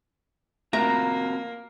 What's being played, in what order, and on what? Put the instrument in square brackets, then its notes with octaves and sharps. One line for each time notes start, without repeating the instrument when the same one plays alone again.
[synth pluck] A3 [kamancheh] A#3 [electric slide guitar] C4 F4 F#4 [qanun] A#5